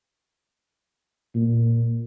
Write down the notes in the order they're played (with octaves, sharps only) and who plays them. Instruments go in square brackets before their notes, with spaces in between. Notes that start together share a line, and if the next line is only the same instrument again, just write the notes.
[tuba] A#2